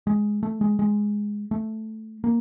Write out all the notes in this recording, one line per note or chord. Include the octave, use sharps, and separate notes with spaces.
G#3
A3
G#3
G#3
A3
A#3